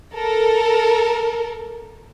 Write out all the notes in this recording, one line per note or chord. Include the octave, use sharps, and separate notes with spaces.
A4 A#4